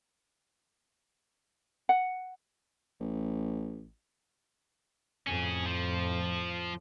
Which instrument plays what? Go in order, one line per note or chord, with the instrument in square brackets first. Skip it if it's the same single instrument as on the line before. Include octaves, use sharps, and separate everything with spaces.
[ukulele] F#5
[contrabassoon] A1
[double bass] F2 A2 [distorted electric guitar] C#4 G#4
[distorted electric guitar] F3